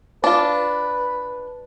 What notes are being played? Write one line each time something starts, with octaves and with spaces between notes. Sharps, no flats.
D4 F4 B4